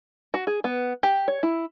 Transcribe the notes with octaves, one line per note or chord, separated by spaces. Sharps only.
F#4
G#4
B3
G4
C#5
E4